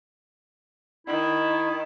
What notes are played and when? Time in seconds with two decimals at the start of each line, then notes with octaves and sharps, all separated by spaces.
1.07 D#3 E4